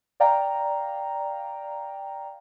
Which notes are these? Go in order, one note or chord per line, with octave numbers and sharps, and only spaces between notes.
D5 F5 G5 A#5